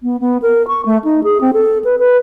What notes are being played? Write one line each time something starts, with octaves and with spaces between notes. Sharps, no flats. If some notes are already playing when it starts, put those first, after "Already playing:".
B3
B3
A#4
C#6
A3
D#4
G#4
C4
A4
B4
B4